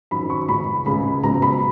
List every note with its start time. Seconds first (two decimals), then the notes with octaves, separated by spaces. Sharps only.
0.11 F#2 D#3 F#3 B5
0.30 C#6
0.49 C#2 C#3 G#3 B5
0.86 C#2 C#3 G#3 B5
1.23 C#2 B2 F#3 A#5
1.42 B5